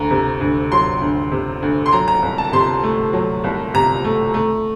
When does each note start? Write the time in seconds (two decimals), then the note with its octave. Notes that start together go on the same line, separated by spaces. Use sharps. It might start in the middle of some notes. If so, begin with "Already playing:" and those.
Already playing: D2 A#5
0.11 C3
0.41 D2
0.72 F#3 C6
1.01 D2
1.31 C3
1.62 D2
1.86 C6
1.93 F#3 A#5
2.08 A#5
2.22 C2
2.38 A5
2.53 C3 C6
2.83 A3
3.13 F#3
3.44 C2
3.74 C3 A#5
4.04 A3
4.34 A3